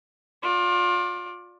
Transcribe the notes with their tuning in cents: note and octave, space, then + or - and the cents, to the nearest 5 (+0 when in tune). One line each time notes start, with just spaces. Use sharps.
F4 +30 D5 +0